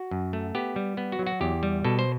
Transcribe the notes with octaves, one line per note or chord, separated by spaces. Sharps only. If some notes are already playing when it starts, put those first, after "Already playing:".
Already playing: F#4
F#2
A3
B3 G4
G3
B3
F#4
F#3
F#4
E2 G4
G3
B2 A4
C5